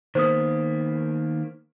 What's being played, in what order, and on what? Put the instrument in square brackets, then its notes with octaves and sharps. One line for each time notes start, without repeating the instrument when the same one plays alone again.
[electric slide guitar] D#3 A#3 B3 [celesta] C5 D#6